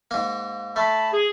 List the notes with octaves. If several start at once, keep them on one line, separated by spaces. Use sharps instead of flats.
G#2 A#3
A3 A5 B5
G#4